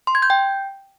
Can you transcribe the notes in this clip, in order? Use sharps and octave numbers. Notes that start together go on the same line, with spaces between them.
C6
G#6
G6
G5